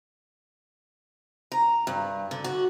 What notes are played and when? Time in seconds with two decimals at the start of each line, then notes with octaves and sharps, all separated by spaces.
1.52 A#5
1.87 G2
2.31 D3
2.44 F#4